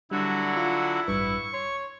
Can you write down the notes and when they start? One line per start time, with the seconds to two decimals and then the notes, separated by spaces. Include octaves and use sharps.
0.11 D3 F#3 G3 D4 E4 F#4
0.57 F4
1.08 A1 G2 B4 C#6
1.53 C#5 C6